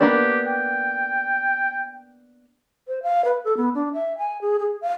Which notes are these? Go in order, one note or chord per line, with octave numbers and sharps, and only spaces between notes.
A#3 B3 D4 G4
G5
C5
F5
B4
A4
B3
D4
E5
G#5
G#4
G#4
F5